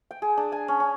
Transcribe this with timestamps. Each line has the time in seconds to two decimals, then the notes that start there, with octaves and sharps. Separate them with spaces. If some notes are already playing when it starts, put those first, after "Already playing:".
0.11 G5
0.22 G#4
0.37 D4
0.52 G#5
0.68 C#4
0.80 C#4